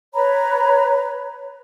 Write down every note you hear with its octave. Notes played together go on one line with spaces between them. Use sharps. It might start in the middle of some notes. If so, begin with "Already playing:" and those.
B4 C#5 A#5 B5